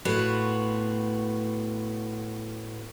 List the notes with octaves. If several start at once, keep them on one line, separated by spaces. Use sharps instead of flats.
A2 B3 F4 F#4